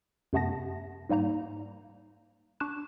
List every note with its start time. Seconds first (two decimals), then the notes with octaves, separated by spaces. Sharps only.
0.33 F#2 C3 A3 B3 A5 A#6
1.09 G#2 G3 A#3 D#4 A#5
2.60 D4 C#6 D6 F#6 E7